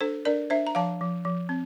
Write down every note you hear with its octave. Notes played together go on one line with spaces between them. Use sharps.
D4 A4 C5
D4 A#4 D5
D4 C5 E5
A#5
F3 F5 A5
F3
F3
C4